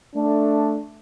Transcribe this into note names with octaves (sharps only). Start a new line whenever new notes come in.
A3 D4